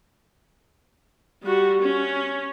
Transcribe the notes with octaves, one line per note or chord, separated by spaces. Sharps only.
G3 F#4
C#4